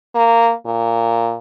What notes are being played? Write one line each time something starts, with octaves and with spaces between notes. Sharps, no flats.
A#3
A#2